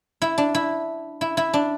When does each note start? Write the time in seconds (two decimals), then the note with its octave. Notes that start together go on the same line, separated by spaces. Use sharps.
0.22 E4
0.38 D4
0.55 E4
1.21 E4
1.37 E4
1.54 D4